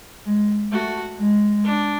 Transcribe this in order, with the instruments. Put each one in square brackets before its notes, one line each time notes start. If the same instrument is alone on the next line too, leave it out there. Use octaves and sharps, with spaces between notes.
[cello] G#3
[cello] A3 [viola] F#4
[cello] G#3
[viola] D4